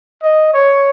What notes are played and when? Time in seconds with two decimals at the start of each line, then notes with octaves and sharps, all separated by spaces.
0.22 D#5
0.53 C#5